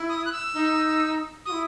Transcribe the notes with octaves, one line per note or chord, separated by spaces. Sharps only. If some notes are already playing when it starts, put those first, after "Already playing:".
Already playing: E4
D#6
F#6
E6
D#4
F#4 D#6
E4